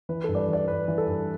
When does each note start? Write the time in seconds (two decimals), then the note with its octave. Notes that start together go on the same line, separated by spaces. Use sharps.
0.09 E3 B4
0.24 G2 A4
0.35 D5
0.38 B4
0.48 E3 D5
0.68 G2 B4
0.88 E3
0.98 A4
1.08 G2